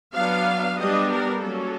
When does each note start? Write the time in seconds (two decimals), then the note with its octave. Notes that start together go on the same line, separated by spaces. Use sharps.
0.14 F#3 B3 D4 F5
0.78 G3 B3 D4 D#5
1.10 A#4
1.41 F#3 A#3 C#4 A4